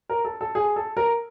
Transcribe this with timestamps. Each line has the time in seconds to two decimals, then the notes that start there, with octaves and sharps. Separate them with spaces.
0.09 A#4
0.25 A4
0.41 A4
0.55 G#4
0.76 A4
0.97 A#4